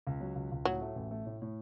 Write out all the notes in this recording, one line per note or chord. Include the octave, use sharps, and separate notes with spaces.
C#2
F#3
C#2
C#2
A2 F#3
A3
A1
A3
A2
A2